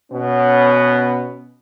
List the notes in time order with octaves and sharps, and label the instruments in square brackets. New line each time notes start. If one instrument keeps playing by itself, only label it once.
[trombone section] B2 B3 C#4